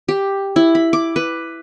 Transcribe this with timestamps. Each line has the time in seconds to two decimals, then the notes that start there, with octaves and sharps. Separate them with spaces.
0.08 G4
0.56 E4
0.75 B5
0.93 D6
1.16 B4